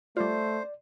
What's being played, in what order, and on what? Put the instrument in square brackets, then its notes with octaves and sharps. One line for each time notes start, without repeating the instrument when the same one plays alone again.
[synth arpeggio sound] G3 F4 [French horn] A3 [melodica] C5 [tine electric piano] D5